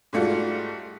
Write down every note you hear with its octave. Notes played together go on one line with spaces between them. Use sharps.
G#2 G3 A3 F4 F#4